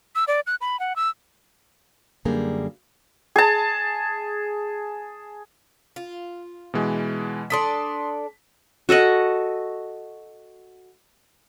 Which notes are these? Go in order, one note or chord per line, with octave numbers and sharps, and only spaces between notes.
E6
D5
F#6
B5
F#5
E6
F#2 D3 G3 A#3 G#4
G#4 A5
F4
B2 E3 G#3
D4 A4 D5 C6 D#6 B6
F#4 A4 D#5 F#5